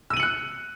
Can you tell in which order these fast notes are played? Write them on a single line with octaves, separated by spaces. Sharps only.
E6 D#7 F#7 C#7 F#6